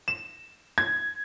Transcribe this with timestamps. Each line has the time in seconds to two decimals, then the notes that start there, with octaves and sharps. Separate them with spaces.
0.08 E7
0.78 G#6